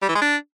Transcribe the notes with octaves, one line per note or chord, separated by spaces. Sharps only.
G3
E3
G#3
D4